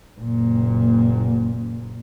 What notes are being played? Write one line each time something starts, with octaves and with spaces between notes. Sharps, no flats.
F#1 A#2